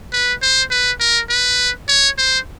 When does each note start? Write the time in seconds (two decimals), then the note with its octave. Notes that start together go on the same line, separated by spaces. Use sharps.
0.13 B4
0.42 C5
0.71 B4
1.00 A#4
1.29 B4
1.88 C#5
2.18 C5